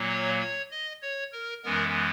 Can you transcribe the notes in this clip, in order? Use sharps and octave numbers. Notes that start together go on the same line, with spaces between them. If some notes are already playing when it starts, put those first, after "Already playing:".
Already playing: A#2 F#3 A#3
C#5
C#5
D#5
C#5
A#4
F#2 E3 G#3 B3 A#4